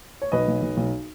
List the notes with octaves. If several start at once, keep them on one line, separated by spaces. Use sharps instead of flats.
C#5
B1 B4 D#5
B1
B1
B1